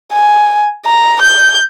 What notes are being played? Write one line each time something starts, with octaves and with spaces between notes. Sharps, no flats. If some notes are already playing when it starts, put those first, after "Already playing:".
G#5
A#5
G6